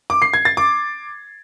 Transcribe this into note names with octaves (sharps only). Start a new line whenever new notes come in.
D6
C7
G#6
A6
D6